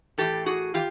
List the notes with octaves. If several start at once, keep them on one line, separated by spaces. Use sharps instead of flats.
A2 E3 G4 A4
F#4 G#4
E3 F4 G4